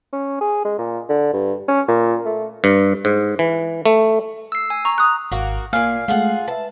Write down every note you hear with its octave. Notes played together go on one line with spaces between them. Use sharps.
C#4
G#4
G#3
A#2
D3
G2
C#4
A#2
A3
G2
G#2
E3
A3
E6 C7
G#5
A#5 C#6
D#6 F#6
G#1 A#3 F#4
A#2 A#3 F5 G#5
G#3 A3 F4 G#4 F#5
B4 E5 A5